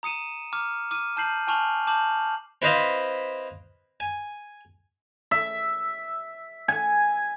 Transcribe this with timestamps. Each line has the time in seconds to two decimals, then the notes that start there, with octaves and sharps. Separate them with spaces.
0.03 A#5 D#6 C#7 D#7 E7
0.53 A#5 D6 F6
0.91 D6 F6 D#7
1.17 A5 F6 G6 C7 F#7
1.47 G#5 A5 C#6 F6 F7 F#7
1.87 A5 D6 G6 F#7
2.62 C4 E4 B4 C5 D#5 F5
4.00 G#5
5.31 E5
6.68 G#5